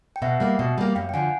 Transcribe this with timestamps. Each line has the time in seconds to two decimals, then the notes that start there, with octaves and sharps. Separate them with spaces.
0.16 G5
0.22 B2 E5 F#5
0.40 G3 A#3
0.59 B2
0.78 G3 A#3
0.95 F#2 F5 G5
1.09 G5
1.14 D3 F3 F#5 G#5